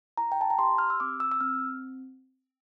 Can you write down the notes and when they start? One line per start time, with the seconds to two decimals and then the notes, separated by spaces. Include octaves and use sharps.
0.17 E4 A#5
0.32 G5
0.41 A5
0.50 A#5
0.58 G4 C6
0.78 F6
0.90 E6
1.00 C4 D6
1.20 E6
1.32 E6
1.41 C4 F6